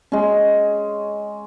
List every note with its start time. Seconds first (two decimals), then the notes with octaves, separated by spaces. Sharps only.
0.12 G#3 C#4